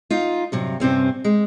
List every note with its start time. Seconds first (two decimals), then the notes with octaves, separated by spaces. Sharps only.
0.10 D#4 F4
0.52 G2 C3 F#3
0.80 G2 C3 C4 C#4
1.24 G#3